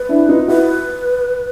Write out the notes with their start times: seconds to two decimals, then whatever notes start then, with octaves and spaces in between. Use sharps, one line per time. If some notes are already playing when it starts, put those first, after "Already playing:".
Already playing: B4
0.09 D4 E4
0.28 D#4 F4
0.48 E4 F#4 B4